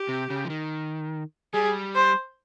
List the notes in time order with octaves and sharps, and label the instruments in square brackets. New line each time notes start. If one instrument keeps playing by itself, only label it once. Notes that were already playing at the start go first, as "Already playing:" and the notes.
Already playing: [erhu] G4
[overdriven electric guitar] C3
C#3
F3
D#3
[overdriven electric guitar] G3 [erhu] G#4
[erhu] C5